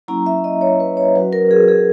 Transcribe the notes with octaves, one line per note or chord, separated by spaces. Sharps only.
F#3 A#3 C#4 E4 A#5
E5
D#5
C#5
B4
C#5
F#3 C#4 F#4 B4
A#4
G#4
G#4